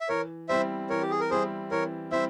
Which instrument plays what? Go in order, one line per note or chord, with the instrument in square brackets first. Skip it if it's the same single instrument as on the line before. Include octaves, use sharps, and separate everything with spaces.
[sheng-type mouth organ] E5
[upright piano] E3 [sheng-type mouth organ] A#4 C#5
[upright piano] G3 C4 E4 [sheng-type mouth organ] C5 E5
[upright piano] E3 [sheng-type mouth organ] A#4 C#5
[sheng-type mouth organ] G4
G#4
A#4
[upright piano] G3 C4 E4 [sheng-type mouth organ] G#4 C5
[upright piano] E3 [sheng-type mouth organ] A#4 C#5
[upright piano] G3 C4 E4 [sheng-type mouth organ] C5 E5